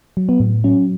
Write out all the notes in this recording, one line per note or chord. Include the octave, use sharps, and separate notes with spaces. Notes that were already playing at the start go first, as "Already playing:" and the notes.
F#3
B3
A2
F#3 C#4